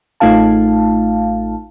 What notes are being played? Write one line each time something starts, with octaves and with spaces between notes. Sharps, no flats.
A1 A3 D#4 F4 F5 A5